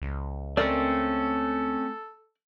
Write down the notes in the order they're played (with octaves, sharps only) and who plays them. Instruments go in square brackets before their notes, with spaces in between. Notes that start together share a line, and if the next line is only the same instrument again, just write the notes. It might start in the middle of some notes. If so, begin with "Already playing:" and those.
[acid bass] C#2
[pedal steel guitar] A3 C4 C#4 [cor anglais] A4 [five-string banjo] A#4 D5